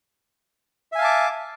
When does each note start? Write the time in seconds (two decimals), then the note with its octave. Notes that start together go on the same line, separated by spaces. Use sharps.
0.92 E5
0.95 G#5
0.98 F5
1.01 A5
1.04 D6